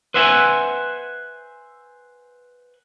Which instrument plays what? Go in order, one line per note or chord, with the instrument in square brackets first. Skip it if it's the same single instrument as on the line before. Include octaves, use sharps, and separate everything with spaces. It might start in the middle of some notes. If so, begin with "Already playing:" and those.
[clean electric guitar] B4 C5 E5 F#5 G#5